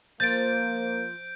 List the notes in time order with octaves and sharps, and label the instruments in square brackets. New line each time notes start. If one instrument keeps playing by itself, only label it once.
[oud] F3 [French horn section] A#3 [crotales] G6 D7 [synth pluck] A6